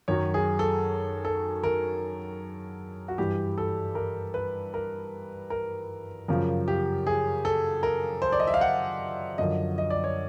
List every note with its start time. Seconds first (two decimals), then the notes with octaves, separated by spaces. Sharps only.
0.08 F#2 D#3 F#3 C#5
0.34 G#4
0.59 A4
1.25 A4
1.64 A#4
3.08 F#4
3.18 G2 E3 G4
3.58 A4
3.95 A#4
4.34 B4
4.74 A#4
5.50 A#4
6.28 F#2 C#3 F3 A#4
6.68 G4
7.07 G#4
7.45 A4
7.83 A#4
8.22 C5
8.32 D5
8.40 D#5
8.47 E5
8.54 F5
8.61 F#5
9.38 F#2 D3 F3 D#5
9.78 D#5
9.90 D5
10.04 C#5